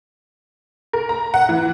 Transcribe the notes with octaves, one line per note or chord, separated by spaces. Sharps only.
A#4
A#5
F#5
E3